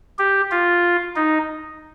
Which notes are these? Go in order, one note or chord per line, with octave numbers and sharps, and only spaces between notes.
G4
F4
D#4